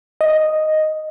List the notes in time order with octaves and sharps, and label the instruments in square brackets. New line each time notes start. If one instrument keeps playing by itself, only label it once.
[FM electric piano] D#5